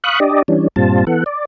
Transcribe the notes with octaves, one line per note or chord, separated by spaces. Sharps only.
F5 B5 C#6 D#6 F#6
D4 G4 D5 D#5
E3 G3 C#4 D4
G2 A#2 G3 C4 F4 A5
E3 B3 A4 F#5
D5